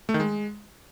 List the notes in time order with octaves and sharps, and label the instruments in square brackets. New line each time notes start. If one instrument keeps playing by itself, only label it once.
[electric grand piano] A3
D#3
G#3